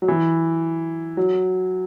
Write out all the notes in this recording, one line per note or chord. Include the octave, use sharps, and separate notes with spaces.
F#3
E3
F#3